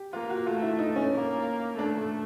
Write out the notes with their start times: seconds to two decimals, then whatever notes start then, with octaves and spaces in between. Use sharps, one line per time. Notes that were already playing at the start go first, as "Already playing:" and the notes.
Already playing: G4
0.13 A#3 F4
0.29 F#4
0.46 A3 F4
0.62 E4
0.79 D#4
0.96 C#4
1.13 A#3
1.78 A3 D4